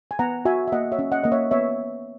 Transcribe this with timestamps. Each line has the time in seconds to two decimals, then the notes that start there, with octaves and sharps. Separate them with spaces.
0.11 G#5
0.19 B3 F#5 A#5
0.45 F#4 E5 G#5
0.67 E5
0.72 A#3 D#5 F#5
0.92 C#5 E5
0.99 C#4
1.12 D#5 F#5
1.24 A#3 D#5
1.32 C#5 E5
1.51 B3 C#5 E5